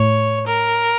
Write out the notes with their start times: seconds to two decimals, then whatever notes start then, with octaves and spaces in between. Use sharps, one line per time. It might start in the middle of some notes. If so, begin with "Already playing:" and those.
Already playing: A2 C#5
0.47 A#4